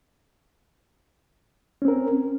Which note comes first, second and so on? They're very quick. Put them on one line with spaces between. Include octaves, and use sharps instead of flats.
C#4 C4 A#4